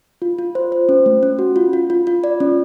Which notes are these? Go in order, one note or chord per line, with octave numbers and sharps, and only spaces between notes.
F4
F4
C5
C5
C#4
A3
C#4
F#4
F4
F4
F4
F4
D5
C#4